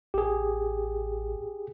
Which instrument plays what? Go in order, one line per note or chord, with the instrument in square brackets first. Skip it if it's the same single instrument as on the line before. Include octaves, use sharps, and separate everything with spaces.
[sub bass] A1 [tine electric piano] G4 G#4